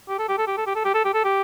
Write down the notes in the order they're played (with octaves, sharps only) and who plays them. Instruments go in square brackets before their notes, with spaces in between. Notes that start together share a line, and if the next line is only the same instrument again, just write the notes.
[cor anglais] G4
A4
G4
A4
G4
A4
G4
A4
G4
A4
G4
A4
G4